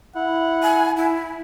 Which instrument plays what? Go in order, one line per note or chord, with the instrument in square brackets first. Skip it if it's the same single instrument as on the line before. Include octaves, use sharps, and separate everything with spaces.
[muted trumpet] E4 [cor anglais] F#5
[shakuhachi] G#5
E4